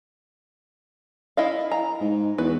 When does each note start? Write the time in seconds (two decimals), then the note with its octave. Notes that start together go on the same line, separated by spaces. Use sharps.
1.37 E4 D#5 F5
1.71 A#5
2.01 G#2
2.38 E2 F#4 B4